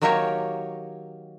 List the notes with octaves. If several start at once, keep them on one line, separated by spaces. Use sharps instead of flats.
D#3 F#3 A#3 G4 A#4 C#5